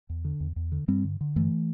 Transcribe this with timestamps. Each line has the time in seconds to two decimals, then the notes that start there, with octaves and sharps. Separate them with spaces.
0.09 E2
0.25 D3
0.40 E2
0.56 E2
0.72 D3
0.88 G2 G3 C4
1.04 D3
1.21 D3
1.36 G2 E3 A3